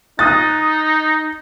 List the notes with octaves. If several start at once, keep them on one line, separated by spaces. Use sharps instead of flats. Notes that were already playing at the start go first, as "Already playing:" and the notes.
D#4 D#6 F#6 A6